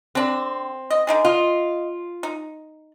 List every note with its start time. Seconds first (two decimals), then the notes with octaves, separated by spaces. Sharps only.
0.15 D3 C4 D4
0.90 D#5
1.07 D3 D#4 G#4
1.25 F4 D#5
2.23 D#4